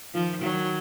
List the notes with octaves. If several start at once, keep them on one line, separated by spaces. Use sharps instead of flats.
D#3 F3
D#3 F#3